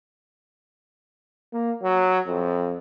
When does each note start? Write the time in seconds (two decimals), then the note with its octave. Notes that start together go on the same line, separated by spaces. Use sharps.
1.53 A#3
1.82 F#3
2.27 F2